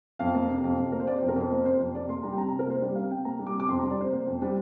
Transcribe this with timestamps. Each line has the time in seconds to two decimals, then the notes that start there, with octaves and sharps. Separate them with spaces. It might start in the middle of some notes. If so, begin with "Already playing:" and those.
0.19 F2 F5
0.35 A#3
0.50 C3
0.64 F2
0.78 F2
0.92 A#3 A#4
1.00 C5
1.07 C3 D5
1.18 F2 C5
1.28 A#4
1.36 F2 C5
1.50 A#3 C5
1.65 C3 C5
1.80 F2
1.94 C3 D5
2.09 A#3 C6
2.23 G3 A#5
2.33 G5
2.37 C3 A#5
2.49 C3 A#5
2.59 A#4
2.67 A#3 C5
2.81 G3 D5
2.95 C3 F5
3.11 C3 G5
3.25 A#3 A#5
3.39 G3
3.47 D6
3.54 C3
3.60 D6
3.68 F2 C6
3.79 G3 A#5
3.90 D5
3.98 C3 C5
4.13 A#3 C5
4.27 F2
4.42 G3